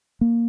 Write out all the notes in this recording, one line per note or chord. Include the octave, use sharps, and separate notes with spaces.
A#3